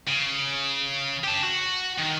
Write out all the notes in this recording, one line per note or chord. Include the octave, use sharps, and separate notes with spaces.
C#3
G4 A5
F#4
D#3